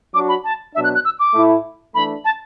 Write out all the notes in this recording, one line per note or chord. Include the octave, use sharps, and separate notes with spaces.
F#3 D4 F#4 D6
B5
A5
B2 F#3 D4 E5
F#6
F#6
E6
D6
A2 A3 E4
E3 A3 D4 B5
A5